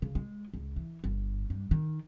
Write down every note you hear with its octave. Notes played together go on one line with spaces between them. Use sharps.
C#3
G#3
C#2
E3
G1
G2
D#3